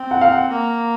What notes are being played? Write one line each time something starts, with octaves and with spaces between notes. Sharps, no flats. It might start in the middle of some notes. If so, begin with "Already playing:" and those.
Already playing: C4
F#5
F5
F#5
A#3